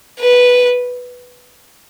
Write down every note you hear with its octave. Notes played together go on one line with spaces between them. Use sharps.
B4